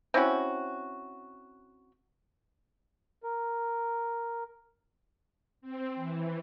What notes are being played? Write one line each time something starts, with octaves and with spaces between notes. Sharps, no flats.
C4 C#4 E4 F#4
A#4
C4
E3